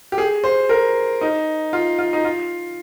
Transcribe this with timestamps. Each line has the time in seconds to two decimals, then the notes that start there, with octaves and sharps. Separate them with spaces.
0.12 G4
0.18 G#4
0.44 C5
0.69 A#4
1.21 D#4
1.73 F4
1.99 F4
2.13 D#4
2.24 F4